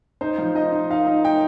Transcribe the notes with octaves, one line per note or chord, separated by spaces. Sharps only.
D#4 C5
F3
D#4 D#5
D#4
D#4 F5
D#4
D#4 G5